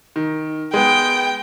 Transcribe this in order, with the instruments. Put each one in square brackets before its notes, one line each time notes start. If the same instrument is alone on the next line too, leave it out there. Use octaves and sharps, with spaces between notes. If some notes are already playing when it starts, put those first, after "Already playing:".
[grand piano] D#3
[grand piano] G#3 B3 [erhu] G5